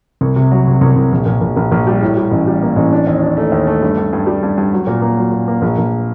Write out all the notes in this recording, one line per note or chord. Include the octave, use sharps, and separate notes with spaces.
C2
C3
F#3
C3
C2
C2
A#1
A#1
A#1
A#1
A#1
G3
A2
G3
A1
G3
A#3
A1
D4
D#2
D4
A3
D#2
A3
G2
G2
G2
G3
G2
G2
F#3
A#2
A#3
F#3
A#2
A#3
A#1
A#1